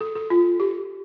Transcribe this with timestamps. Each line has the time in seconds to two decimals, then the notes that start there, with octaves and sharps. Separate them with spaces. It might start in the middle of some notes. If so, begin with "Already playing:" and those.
0.01 A4
0.15 A4
0.30 F4
0.60 G4